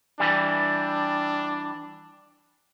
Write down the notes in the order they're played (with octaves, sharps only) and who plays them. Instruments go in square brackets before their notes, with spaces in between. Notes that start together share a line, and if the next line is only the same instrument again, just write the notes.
[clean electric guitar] E3 G3 [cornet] D4